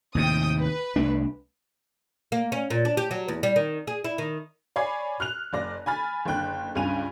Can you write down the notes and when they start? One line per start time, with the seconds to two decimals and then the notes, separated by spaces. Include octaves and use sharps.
0.15 D#2 A2 C3 G5 D#6
0.61 B4
0.96 C2 A3 D4
2.32 A#3
2.52 C#4
2.70 A#2
2.85 D4
2.97 G4
3.11 F#3
3.28 E2
3.43 G3
3.56 D#3
3.87 G#4
4.05 E4
4.18 D#3
4.76 C#5 D5 G#5 B5 G#6 C7
5.20 F6 F#6 F7
5.53 F#1 D5 A#6
5.86 G#5 B5 F6 A6
6.25 F#1 D3 G5 F#6
6.75 C#2 G2 C#3 G#5 D#7 F7